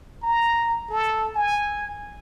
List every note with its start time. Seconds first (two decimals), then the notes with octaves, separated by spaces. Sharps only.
0.23 A#5
0.90 A4
1.35 G#5